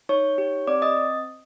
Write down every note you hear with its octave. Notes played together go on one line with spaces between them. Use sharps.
D#4 C#5 C#6
G4
C4 D5 D6
D#5 D#6